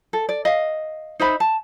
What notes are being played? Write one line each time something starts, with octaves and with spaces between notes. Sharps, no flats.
A4
D5
D#5 F5
D#4 C5 E5 B5
A5